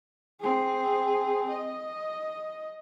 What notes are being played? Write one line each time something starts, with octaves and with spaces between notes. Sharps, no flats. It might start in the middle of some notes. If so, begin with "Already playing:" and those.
C4 G#4
D#5